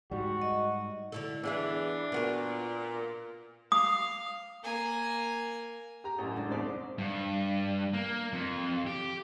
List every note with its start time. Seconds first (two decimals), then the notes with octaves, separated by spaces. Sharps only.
0.11 G#2 G3 F#4
0.42 D#5
1.12 D3 E4 A4
1.44 E3 B3 D4 G#4 E5
2.12 A#2 B3 F#4 A#4
3.72 F5 D#6
4.64 A#3 G#5
6.04 G4 A#5
6.18 A1 F#2
6.36 G#3 D4
6.50 E1 C2 D#4 C5 D5
6.98 G2
7.93 A#3
8.33 F2
8.86 G4